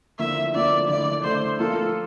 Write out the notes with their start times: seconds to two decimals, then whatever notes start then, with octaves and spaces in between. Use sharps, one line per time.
0.19 D3 F3 A#3 E4 E5
0.54 D3 F3 A#3 E4 D5
0.89 D3 A3 E4 D5
1.24 D3 A3 E4 C5
1.59 F3 A#3 F4 A4